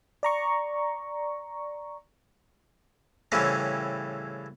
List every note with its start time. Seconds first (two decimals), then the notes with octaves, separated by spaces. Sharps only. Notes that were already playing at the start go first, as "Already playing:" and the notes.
0.23 D5 A#5 C#6
3.32 A2 C#3 E3 G3 C4 C#4